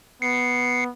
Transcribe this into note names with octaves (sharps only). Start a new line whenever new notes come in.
B3 C7 C#7